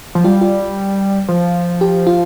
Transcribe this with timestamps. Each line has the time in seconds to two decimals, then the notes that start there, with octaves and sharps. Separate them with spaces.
0.15 F3
0.24 G3 F4
0.41 F4
1.28 F3
1.81 G4
2.07 F4